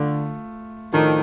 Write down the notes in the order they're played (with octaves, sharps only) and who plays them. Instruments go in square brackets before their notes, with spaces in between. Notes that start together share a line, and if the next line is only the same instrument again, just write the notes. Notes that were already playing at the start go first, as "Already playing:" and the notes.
Already playing: [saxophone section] D3 [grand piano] A3 F4
[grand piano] A2 F3 A3 D4 [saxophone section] D#3